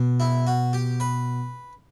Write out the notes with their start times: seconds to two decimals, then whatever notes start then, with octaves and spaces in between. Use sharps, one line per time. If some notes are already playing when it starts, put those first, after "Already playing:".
Already playing: B2
0.20 E4
0.47 F#4
0.73 G4
1.00 B4